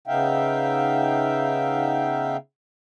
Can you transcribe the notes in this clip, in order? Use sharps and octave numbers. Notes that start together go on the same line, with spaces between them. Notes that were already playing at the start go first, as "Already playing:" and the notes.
C#3 B3 D#4 E5 F5 G5